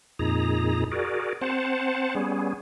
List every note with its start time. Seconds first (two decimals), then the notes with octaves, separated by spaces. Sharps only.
0.19 F2 A#2 D#4 G#4 A#5
0.92 F#4 G#4 A#4 D5
1.41 C4 C5 F#5 A5
2.15 G3 B3 C#4 G#4